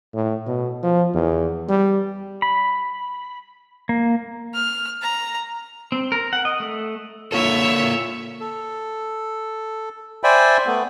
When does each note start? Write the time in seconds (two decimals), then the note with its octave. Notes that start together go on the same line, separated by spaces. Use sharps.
0.14 A2
0.47 B2
0.83 F3
1.14 E2
1.68 G3
2.42 B5
3.89 A#3
4.54 F6
5.02 A#5
5.92 C4
6.12 A#4
6.33 F#5
6.45 D#5
6.60 A3
7.32 A#3 F4 A4 C#5 E5
8.40 A4
10.24 C5 D5 E5 G5 G#5 B5
10.67 A3 B3